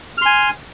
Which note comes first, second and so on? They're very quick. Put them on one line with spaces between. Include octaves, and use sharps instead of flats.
F6 C6 G#5